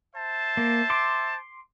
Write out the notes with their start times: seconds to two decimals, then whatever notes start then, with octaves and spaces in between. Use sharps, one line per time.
0.16 C5 E5 A5
0.57 A#3
0.90 C6 D6